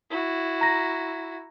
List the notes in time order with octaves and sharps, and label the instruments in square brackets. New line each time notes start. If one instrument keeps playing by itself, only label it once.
[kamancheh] E4 F#4
[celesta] A#5 A#6